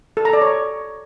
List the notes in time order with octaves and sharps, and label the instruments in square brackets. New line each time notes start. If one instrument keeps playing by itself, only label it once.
[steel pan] A4
A#5
D5
C#5